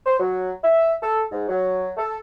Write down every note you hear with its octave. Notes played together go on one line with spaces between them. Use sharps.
C5
F#3
E5
A4
G#2
F#3
A4